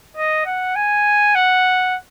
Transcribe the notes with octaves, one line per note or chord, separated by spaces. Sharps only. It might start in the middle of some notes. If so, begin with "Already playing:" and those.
D#5
F#5
G#5
F#5